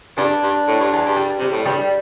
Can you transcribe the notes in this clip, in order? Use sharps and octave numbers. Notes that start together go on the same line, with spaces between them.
G2 D4
G2
A2
G2
E2
G2
G3
C3 G3
A2
G2 G3